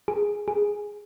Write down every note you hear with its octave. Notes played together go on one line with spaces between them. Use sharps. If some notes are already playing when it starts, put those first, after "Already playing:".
G#4
G#4